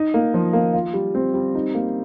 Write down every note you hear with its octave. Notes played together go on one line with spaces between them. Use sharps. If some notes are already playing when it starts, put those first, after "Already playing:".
Already playing: D#4
A#3
F3
A#3
F4
G3
C4
G3
D#4
A#3